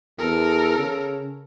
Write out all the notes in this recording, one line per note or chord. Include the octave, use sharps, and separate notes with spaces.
E2 A4 A#4
C#3